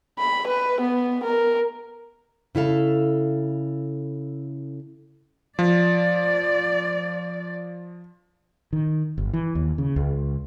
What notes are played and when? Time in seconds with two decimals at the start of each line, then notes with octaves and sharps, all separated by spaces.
0.18 B5
0.47 B4
0.81 B3
1.24 A#4
2.55 C#3 E4 A4 F5
5.59 F3 D5
8.73 D#3
9.18 G1
9.33 E3
9.55 D#2
9.78 C#3
9.96 C#2